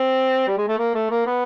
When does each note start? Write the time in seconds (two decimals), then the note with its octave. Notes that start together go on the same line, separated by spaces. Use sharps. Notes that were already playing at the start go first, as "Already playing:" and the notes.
Already playing: C4
0.47 G3
0.58 G#3
0.68 A3
0.78 A#3
0.94 A3
1.10 A#3
1.26 B3